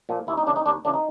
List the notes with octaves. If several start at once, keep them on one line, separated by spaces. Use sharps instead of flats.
A#2 F3
D#2 E4
D#4
C#3 E3 D4
D#4
D#2 D4
C#3 E3 D4
D#4